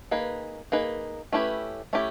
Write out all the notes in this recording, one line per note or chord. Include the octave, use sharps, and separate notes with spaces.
A#3 D#4 G#4 B4
A#3 D#4 G#4 B4
A3 C#4 E4 G4 B4
A3 C#4 E4 G4